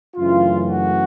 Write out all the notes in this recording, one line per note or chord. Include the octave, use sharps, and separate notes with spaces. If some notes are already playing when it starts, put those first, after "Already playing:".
F#2 C#3 E3 A3 D4 F4
F#4